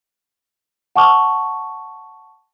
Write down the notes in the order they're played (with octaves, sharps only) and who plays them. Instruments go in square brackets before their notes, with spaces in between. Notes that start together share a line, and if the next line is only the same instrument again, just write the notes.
[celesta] F#5 A5 C#6 D6 F6